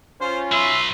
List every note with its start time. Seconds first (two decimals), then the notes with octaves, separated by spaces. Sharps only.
0.21 C#4 F4 C5
0.52 F#3 B4 E5 C6